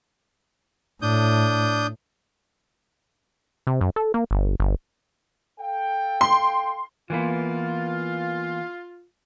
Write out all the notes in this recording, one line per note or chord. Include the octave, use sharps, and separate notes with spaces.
A2 D4 D#6 G6
C3
F#2
A4
A#3
G1
G1
A4 F5 G5
C6
E3 A#3 B3 F4